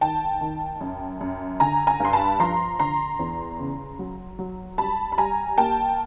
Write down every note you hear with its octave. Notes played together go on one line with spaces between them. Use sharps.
D#3 G5 A5
D#3
F#2
F#2
D3 G#5 A#5
G#5 A#5
G2 C6
A5 B5
F3 A#5 C6
D3 A#5 C6
E2
C#3
F#3
F#3
G3 A5 B5
B5
G3 G#5 A#5
A#3 G5 A5